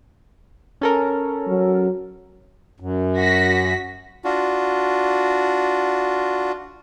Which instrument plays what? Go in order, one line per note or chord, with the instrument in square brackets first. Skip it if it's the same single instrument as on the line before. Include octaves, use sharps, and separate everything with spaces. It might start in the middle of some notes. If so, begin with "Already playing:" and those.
[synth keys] C#4 A4 A#4
[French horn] F#3
[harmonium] F#2
[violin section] F#4 A#6 B6
[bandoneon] D4 F4 F#4